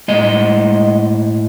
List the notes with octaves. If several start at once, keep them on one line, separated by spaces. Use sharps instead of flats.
A2 G#3 D#5